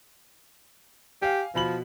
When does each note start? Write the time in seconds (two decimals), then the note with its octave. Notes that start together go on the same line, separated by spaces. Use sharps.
1.22 G4 F5 G#5
1.55 B2 F3 B5 F#7